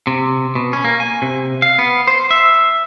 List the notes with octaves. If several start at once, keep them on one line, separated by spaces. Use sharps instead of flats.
C3
B2
C#4
A#3
G#5
C3
F5
B3
C5
E5